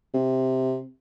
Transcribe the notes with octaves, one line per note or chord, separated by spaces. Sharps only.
C3